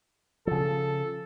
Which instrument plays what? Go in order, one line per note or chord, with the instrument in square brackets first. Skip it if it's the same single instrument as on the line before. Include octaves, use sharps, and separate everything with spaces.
[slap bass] C#3 F3 [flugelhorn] A4